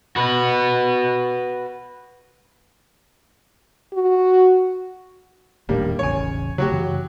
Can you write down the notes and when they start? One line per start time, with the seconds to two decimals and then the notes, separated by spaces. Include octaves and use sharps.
0.16 F#4 B4
3.94 F#4
5.69 D#1 A2 D#3 G3 A#3 D4
5.99 E1 A1 C#3 C#5 G#5
6.58 C#3 F#3 A3 F#4 G4
6.72 F#2 C#3 E3